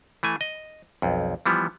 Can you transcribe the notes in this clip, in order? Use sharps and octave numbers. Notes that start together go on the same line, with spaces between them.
E3 A3 G#5
D#5
B1 F2
E3 F3 G3 B3